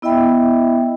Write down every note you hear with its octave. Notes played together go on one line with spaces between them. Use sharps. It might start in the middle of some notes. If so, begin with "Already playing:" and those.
B3 E4 D#5 E5 G5 B5